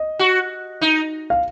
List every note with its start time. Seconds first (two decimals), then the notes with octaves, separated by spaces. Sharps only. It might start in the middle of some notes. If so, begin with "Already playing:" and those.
Already playing: D#5
0.19 F#4
0.81 D#4
1.30 F5